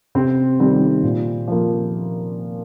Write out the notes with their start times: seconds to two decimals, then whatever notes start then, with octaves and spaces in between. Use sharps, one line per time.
0.15 C3 C4
0.60 D#3 G3 C4
1.03 A#2
1.48 F3 A#3